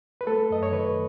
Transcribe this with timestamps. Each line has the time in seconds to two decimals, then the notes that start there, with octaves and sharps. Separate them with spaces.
0.21 B4
0.27 A3 A4
0.50 F#2 D#5
0.63 C#5
0.72 D#3 B4